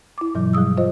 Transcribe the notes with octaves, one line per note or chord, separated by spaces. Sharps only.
E4 D6
G2 B2 E3 F#3
F3 G3 G#4 D#6 E6
F4 C5 D#5